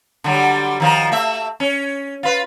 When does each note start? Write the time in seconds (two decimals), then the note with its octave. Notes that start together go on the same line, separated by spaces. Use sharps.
0.24 D3 F#3 G3
0.80 D#3 F3 A#4
1.12 A3 E5
1.60 C#4
2.23 F4 B4